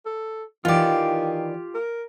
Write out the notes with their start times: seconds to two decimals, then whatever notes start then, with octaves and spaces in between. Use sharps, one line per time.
0.06 A4
0.65 D#3 E3 F4 G4 D5
1.75 A#4